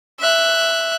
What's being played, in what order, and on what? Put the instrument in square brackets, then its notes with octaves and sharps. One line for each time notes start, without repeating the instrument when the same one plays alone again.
[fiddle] E5 F#6